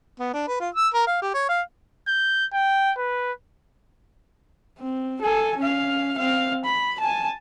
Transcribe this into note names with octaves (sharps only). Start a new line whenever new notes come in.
B3
D4
B4
F4
E6
A#4
F5
G4
C#5
F5
G6
G5
B4
C4
A4 G#5
C#4 F5
C4 F5
B5
G#5 A5